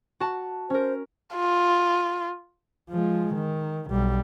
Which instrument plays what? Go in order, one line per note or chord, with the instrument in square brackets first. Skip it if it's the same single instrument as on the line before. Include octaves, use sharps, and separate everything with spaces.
[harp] F#4 A5
[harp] C#4 A#4 [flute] C5
[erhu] F4
[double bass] F3 G#3
D#3
B1 G3